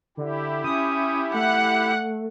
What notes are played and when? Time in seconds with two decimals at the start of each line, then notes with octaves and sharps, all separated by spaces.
0.17 D3 E4 G4
0.64 C#4 D#6
1.34 A3 F#5 F#6